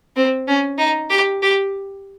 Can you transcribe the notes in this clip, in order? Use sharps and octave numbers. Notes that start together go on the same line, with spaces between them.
C4
C#4
D#4
G4
G4